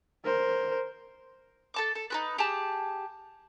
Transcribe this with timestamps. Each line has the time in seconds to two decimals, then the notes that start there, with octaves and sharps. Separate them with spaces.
0.25 A#4 C5
1.74 A4 A5 D6
1.95 A4
2.10 D#4 F#4 B4
2.38 G4 G#4 A5